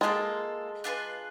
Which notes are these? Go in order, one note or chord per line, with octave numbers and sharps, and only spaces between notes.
G#3 A#3 D4 F4 A4
D4 F4 G#4 B4